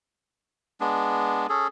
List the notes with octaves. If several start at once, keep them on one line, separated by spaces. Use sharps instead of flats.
G#3 B3 D4
C#4 G#4 A4